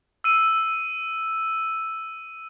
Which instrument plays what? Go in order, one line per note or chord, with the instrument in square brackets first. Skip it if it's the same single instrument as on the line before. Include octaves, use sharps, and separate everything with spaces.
[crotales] E6 D#7